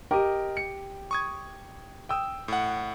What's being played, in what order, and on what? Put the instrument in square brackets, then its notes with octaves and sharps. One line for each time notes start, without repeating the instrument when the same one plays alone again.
[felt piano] G4 [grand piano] A#4 D#5
[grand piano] C#7
[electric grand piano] C#6 D#6 G#6
[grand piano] G5 D#6 E6
[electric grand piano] A2 F#5